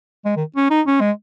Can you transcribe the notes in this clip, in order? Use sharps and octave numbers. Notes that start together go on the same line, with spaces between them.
G#3
D#3
C#4
D#4
C#4
G#3